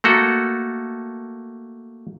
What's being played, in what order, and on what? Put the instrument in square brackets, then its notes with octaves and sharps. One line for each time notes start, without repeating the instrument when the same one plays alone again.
[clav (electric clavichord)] A3 A#3 F#4 A4